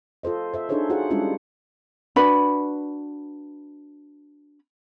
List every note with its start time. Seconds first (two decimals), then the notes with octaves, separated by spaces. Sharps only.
0.23 F4 A4 C5 D#5
0.54 C5 E5
0.69 D4 D#4 G#4 A4 C5 C#5
0.90 F4 F#4 G#4 C5 F#5
1.10 G3 G#3 C#4 D4 E4 F4
2.16 D4 F#4 B4 B5